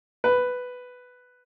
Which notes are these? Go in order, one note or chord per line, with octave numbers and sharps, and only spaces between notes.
B4